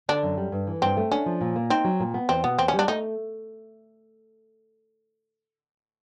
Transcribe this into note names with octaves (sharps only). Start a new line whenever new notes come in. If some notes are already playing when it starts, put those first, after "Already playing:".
D3 D4
F#2
G3
G2
E3
G2 C4
A3
C#4 D4
F3
A#2
A#3
C4 D#4
F#3
A#2
B3
E2 C4
B2 B3
E2 C4
C#4
G3
D4
A3 D#4